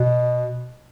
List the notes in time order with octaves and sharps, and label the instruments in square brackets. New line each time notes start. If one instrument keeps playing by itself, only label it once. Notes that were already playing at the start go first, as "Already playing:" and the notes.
Already playing: [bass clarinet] B2